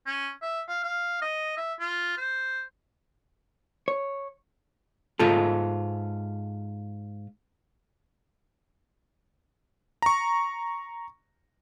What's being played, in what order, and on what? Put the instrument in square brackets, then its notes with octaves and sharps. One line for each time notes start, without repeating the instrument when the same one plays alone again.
[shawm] C#4
E5
F5
F5
D#5
E5
F4
C5
[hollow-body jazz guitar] C#5
G#2 F4 A4
[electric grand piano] A#5 C#6